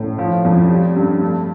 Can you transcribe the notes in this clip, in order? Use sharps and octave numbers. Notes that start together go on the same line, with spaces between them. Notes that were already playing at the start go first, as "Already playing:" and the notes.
Already playing: A2
F3
F2
G3
G2
A3